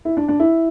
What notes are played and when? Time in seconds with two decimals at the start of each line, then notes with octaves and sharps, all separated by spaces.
0.05 E4
0.17 D4
0.28 D4
0.40 E4